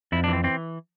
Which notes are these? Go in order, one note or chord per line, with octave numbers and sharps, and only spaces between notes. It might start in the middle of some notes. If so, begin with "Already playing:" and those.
F2 E4
D4
E3 C4
E3 C4